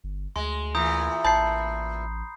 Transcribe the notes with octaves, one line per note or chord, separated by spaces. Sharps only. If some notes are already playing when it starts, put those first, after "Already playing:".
G1
D2 G#3 C6
A#2 E3 A#5 D#6 G6
A1 A5 B5 G6 C7